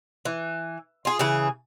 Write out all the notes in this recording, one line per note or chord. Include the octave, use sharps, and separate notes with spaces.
E3
F4 G#4
C#3 E3 G#4